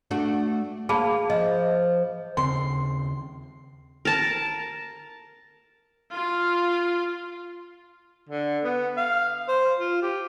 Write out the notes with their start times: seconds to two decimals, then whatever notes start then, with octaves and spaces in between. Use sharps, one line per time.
0.11 A3 D4 F#4
0.89 A#3 G#4 A5 B5
1.30 F3 D#5
2.37 D#2 C#3 C4 C6
4.05 A#4 A5
6.12 F4
8.29 D3
8.64 B3
8.97 F5
9.48 C5
9.79 F4
10.02 G4